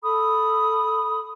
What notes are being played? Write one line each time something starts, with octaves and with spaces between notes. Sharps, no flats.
A4 B5 D#6